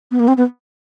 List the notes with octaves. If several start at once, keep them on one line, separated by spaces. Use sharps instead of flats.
B3
A#3
C4
B3